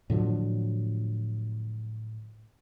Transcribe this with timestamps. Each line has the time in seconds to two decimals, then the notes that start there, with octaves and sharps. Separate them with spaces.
0.10 A2 D3 F3 F#3